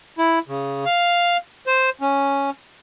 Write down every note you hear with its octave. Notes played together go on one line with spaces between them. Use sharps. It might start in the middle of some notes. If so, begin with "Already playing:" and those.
E4
C#3
F5
C5
C#4